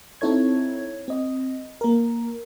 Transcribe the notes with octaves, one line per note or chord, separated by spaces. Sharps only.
C4 D#4 E4 A4 C#5 G#6
C4 D#5
A#3 A#4